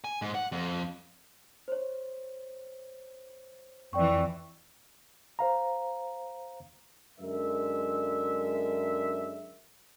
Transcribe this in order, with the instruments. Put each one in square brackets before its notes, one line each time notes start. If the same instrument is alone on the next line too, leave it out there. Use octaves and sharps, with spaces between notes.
[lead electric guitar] G#5
G#2
F#5
F2
[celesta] C5 C#5
[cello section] F2 E3 [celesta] D5 G5 C#6
[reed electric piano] C5 F5 A#5
[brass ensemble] F#2 D3 G#3 A#4 E5